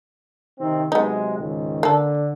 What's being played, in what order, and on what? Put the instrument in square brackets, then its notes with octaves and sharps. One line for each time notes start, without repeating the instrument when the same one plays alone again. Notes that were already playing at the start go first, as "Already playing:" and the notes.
[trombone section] C3 D#3 C4
[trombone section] C3 F#3 G#3 [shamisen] B3 D#4
[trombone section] C#2 G#2 D#3
[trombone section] D3 [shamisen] A#3 A4